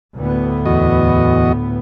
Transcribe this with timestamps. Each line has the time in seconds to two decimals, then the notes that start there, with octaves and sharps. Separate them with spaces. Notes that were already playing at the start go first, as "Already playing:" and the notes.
0.14 D2 A2 B3
0.66 E2 F#4 D#5